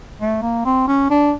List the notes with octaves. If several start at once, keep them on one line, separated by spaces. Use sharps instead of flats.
A3
A#3
C4
C#4
D4